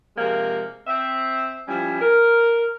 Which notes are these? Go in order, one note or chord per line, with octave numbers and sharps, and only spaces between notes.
C3 F3 G#3 A#3
C4 E5
F3 G3 C#4 E4
A#4